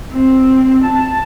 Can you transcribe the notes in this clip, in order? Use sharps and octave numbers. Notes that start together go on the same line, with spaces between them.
C4
A5